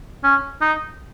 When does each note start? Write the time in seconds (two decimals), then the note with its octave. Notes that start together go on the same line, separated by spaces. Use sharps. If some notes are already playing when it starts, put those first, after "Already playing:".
0.24 C#4
0.62 D#4